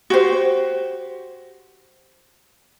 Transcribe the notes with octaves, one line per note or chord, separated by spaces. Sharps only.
F#4 G4 C5